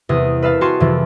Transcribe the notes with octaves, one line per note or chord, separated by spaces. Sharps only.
E2 C3 D#6
B4 E5 F5 A5
F#4 G#4 G5 A5 C6 C#6
F2 C3 E3